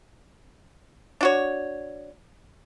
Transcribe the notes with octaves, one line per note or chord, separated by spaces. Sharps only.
D4 F#4 C#5